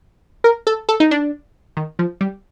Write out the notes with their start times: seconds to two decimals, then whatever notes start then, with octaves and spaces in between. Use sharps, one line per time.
0.44 A#4
0.67 A4
0.89 A4
1.00 D#4
1.11 D4
1.77 D#3
1.99 F3
2.21 G3